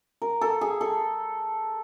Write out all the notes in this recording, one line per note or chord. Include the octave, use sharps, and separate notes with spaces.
A#4
A4
G#4
A4